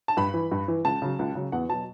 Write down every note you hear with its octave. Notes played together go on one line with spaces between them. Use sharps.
A5
G2 B5
E3
G2
E3
C#2 A5
C#3 F#3
C#2
C#3 F#3
E2 F#5
B2 F#3 A5